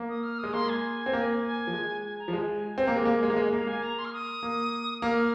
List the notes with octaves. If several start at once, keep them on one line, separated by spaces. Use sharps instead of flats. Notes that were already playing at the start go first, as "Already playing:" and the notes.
Already playing: A#3
D#6
F6
D#6
G#3
A#3 C6
G#5
C4
A#3
G#5
F3
G#3
G#5
A#5
F3
G#3 G#5
C4
A#3 A#5
G#3 G#5
A#3
G#3
A#3
G#3
A#3 F5
A#3 G#5
A#5
C6
F6
D#6
A#3
A#3 F6